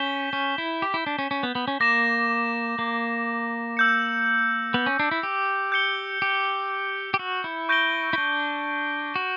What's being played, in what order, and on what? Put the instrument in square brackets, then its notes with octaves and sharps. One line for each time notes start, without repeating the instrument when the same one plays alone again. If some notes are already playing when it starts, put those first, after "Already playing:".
Already playing: [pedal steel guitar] C#4 [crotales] G6 B6 E7 G7
[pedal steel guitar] C#4
E4
G4
E4
D4
C#4
C#4
B3
B3
C#4
[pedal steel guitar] A#3 [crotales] D6 A#6 E7
[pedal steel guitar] A#3
[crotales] E6 G6 C#7
[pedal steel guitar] B3
C#4
D4
E4
G4
[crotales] G6 C#7 G7
[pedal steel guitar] G4
G4
F#4
E4
[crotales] C#6 G6 A#6 D7 G7
[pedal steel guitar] E4
D4
F#4